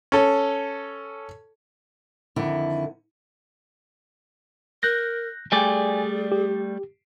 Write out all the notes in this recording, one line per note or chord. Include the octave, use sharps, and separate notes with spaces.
C#4 A4
F2 D3 D#3 E4
A#4 F#6 G6 A#6
G3 A3 G#4 D5 G5 G#5
G4